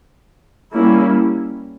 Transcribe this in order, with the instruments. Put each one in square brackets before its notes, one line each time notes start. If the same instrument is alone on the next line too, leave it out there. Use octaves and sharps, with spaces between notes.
[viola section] G3 A#3 C#4 E4